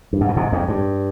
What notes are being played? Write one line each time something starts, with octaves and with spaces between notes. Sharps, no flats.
G2
G#2
B2
G#2 C3
F2 G#2
G2